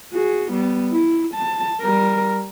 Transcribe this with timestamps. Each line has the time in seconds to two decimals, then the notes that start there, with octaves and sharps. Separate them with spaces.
0.13 F#4 G#4
0.52 G3 B3
0.93 E4
1.35 A5
1.81 G3 A#4